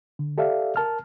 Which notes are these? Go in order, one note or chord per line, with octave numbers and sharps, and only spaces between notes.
D3
G4 A4 D5 E5 F5
A#4 A5 F6